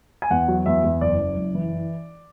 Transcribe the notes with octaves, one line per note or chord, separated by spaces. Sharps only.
G#5
E2 F#5
F#3
E2 E5
E2
F#1 D5
F#2
F#1
E3